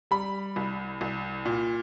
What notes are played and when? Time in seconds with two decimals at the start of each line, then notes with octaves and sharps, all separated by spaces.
0.11 G3 B5
0.56 C2
1.01 C2
1.45 A#2